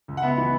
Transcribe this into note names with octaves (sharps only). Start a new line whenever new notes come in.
C#2
F#5
B3 E5
E3